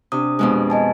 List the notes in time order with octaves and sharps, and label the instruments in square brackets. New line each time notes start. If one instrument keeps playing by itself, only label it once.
[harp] C3 [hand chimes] D4 D#6
[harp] F2 B2 G#3
[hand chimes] D#5 G#5 A5